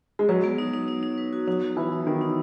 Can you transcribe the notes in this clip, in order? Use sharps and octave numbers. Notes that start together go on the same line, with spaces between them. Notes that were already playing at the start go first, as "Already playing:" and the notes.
G#3
F#3 B4
B3
D#4
D#4
D#4
D#4
B4
F#4
F#3 D#4
F#4
E3 B4
D#4
D#3 B3
D#4